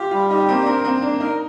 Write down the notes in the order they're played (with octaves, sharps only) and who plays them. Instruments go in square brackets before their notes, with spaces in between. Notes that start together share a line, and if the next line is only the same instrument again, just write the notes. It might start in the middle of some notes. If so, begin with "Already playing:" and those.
Already playing: [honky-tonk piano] F4 [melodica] G4
[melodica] G3 [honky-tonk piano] F4
[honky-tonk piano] D#4 [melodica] G4
[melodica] A#3 [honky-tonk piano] C4
[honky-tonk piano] D4
[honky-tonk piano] C4 [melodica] A#4
[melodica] A#3 [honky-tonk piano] C4
[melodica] A#3 [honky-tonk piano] D4
[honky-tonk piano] D#4 [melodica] A#4